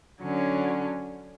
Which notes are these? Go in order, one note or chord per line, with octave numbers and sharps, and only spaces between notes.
D3 F#3 C#4